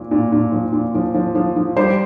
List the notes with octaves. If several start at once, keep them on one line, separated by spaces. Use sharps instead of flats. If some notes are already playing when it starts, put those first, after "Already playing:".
Already playing: A#2 F3
A#2
A#2
F3
A#2
F3
F3
F3
F3
G3 C5